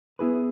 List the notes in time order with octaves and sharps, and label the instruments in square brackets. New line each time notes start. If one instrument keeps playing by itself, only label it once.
[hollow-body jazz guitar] B3 E4 G#4 B4